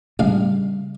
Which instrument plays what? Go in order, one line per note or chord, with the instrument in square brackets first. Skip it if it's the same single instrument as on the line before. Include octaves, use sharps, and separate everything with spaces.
[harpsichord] A1 F5 [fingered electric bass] C#3 G3